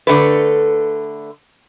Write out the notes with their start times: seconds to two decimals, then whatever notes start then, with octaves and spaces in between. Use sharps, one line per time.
0.07 D3 A3 B4